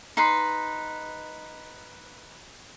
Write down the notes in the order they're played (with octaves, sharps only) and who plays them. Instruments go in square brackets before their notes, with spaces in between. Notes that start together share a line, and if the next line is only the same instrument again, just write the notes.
[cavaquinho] D#4 B4 C6